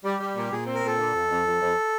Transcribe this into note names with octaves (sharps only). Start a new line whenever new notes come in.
G3 G4
G3
A#2
A#2 G#4
C4
A#4
A#2 A4
D3
F2
F2
F2
F2